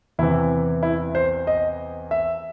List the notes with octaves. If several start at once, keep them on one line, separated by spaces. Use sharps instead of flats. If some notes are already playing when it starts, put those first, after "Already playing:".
E2 C3 E3 E4
E4
C5
D#5
E5